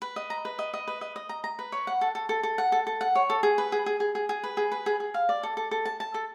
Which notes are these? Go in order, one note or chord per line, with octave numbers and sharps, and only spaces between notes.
B4
D#5
A#5
B4
D#5
D#5
B4
D#5
D#5
A#5
A#5
B4
C#5
F#5
A4
A4
A4
A4
F#5
A4
A4
F#5
C#5
A4
G#4
B4
G#4
G#4
G#4
G#4
G#4
B4
G#4
B4
G#4
G#4
F5
D5
A4
A4
A4
A5
A5
A4